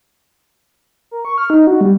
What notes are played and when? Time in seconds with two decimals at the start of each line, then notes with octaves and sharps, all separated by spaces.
1.11 A#4
1.25 C#6
1.38 F6
1.50 D#4
1.67 F#4
1.81 G3